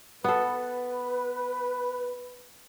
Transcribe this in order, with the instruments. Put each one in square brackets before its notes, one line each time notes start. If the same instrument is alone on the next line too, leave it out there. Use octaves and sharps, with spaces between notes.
[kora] B3 A4 [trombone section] B4